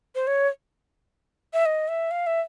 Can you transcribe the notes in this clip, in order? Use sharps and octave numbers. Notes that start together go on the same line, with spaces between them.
C5
C#5
E5
D#5
E5
F5
E5